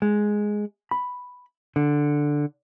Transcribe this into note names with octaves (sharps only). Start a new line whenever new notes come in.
G#3
B5
D3